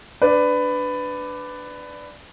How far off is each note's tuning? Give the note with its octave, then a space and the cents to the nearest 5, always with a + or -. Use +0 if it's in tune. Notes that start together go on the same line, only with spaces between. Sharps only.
D4 +0 B4 +15 D5 +0